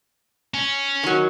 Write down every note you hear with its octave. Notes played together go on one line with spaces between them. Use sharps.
C#4
D#3 F#3